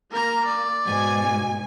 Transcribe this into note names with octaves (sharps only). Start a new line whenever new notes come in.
A#3 A#4 A#5
D5
G#2 B2 G#5